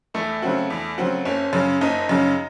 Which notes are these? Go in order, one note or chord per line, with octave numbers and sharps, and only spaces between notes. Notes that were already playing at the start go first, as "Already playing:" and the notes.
E2 A3
C#3 F#3 C4 F#4
E2
C#3 F#3 C4 F#4
F#1 C#4
F#2 C#3
F#1 D#4
F#2 C#3